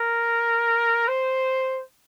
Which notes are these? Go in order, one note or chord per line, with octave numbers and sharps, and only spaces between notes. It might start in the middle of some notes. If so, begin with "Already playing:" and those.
Already playing: A#4
C5